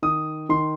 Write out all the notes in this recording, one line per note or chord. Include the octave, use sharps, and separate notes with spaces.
D#3 D#6
D#3 C6